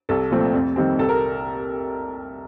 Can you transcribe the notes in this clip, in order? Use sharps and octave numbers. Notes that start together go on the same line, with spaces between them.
C2 A4
A#2 F3 A3 C4
F2
D#3 G3 C4
C2 A4
A#4